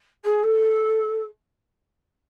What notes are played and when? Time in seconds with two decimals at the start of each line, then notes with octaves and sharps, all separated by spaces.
0.24 G#4
0.43 A4